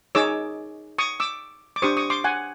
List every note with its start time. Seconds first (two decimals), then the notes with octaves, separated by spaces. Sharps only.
0.15 D#4 G#4 C#5 D6 E6
0.98 C#6 D#6
1.20 D6 E6
1.76 D6
1.82 D4 G4 C5 C#6 D#6
1.97 C#6 D#6
2.10 C6 D6
2.24 F#5 G#5